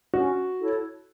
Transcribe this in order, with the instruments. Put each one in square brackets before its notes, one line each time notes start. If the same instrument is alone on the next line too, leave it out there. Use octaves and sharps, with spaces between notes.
[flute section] C#4 [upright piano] F#4
[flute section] E4 A4 C#5